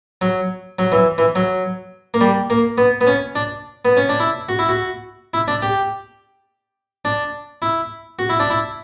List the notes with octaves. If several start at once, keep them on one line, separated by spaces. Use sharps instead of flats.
F#3
F#3
E3
E3
F#3
A#3
G3
A#3
B3
B3
C#4
D4
B3
C#4
D4
E4
F#4
E4
F#4
E4
D4
G4
D4
E4
F#4
E4
D4
E4